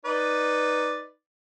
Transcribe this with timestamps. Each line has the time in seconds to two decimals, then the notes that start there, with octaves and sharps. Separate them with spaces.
0.05 D#4 B4 D5